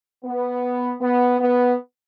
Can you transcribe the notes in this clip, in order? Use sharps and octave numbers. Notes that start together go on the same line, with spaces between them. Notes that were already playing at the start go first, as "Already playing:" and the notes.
B3
B3
B3